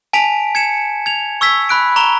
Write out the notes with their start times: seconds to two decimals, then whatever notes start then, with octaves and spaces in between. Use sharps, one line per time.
0.13 G#5 A5 B6 D7 F7
0.55 G#6 C#7 E7
1.06 G#6 F7
1.41 C#6 E6 G#6 B6
1.69 B5 F#6 D7
1.96 A#5 C#6 F7 G7